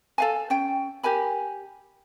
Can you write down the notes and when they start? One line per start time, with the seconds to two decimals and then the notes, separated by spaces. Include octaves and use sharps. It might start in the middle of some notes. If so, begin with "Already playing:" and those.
0.18 A4 F5 G#5
0.50 C#4 G5
1.03 G4 A#4 G#5 B5